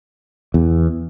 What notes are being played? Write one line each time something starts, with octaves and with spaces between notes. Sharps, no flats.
E2